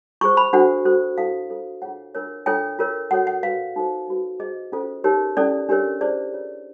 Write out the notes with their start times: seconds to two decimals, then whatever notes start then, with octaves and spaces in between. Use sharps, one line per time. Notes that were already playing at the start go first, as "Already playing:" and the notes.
0.21 F4 G#4 C5 C#6
0.37 B5
0.53 D4 F#4 A4 C5 F#5
0.85 F#4 A4 C5
1.18 E4 A4 C5 F5
1.50 F4 A4 C5
1.82 D4 F4 G#4 C#5 F#5
2.15 D4 F4 A#4 C#5
2.46 D4 F4 A4 C#5 G5
2.79 F4 A#4 C#5
3.11 F#4 A4 C#5 F#5
3.27 F#5
3.43 F#4 B4 F5
3.76 D#4 F#4 A4 C5
4.07 D#4 F#4 B4
4.40 F4 G#4 C5 D#5
4.72 C#4 F4 A4 C5
5.04 D#4 G4 A#4 C#5
5.37 C#4 E4 A4 D5
5.69 D4 G4 A#4 C#5
6.01 E4 G#4 C5 D5
6.33 F4 A#4 C#5